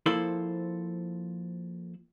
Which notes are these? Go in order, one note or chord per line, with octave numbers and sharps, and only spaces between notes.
F3 A#3 E4 A4 C5